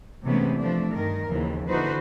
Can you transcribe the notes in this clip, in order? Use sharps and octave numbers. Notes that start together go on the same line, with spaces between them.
C3 E3 G#3 A3 B3 C#4
F3 A3 D4
G2 D#3 A#4
D#2 C#3 E3 F3
D3 E3 D#4 F#4 B4 C5